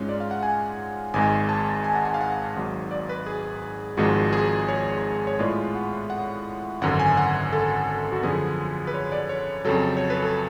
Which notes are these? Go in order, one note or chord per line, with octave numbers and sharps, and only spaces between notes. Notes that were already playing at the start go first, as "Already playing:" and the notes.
Already playing: G#2 G#3 C#4 F4
D5
F5
F#5
G#5
G#1 G#2 G#3 G#5
A5
G#5
F#5
G#5
F5
F#5
G#1 G#2 F#3
D5
B4
G#4
G#1 G#2 F3 G#3 F#4
G#4
C#5
C#5
A2 G#3 B3 F4 D5
F#5
F#5
G#1 F#2 D3 F#5
G#5
F#5
A4
F#4
F#2 D3 F3 B3 G#4
B4
C#5
D5
C#5
F2 C#3 F#3 A4
C#5
B4
A4